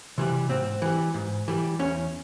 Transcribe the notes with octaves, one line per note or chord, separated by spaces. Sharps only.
C3 E3 G3
G#2 C4
E3 G3
G#2
E3 G3
E2 C#4